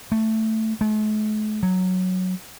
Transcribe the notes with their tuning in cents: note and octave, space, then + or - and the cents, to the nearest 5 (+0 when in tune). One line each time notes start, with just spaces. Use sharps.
A3 +5
A3 -45
F#3 -5